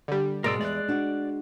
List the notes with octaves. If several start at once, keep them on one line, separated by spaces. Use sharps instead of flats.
D3 G3
G#2 B2 G#3 A#4 D5 E6
E2 D5 F#6
D4 F#4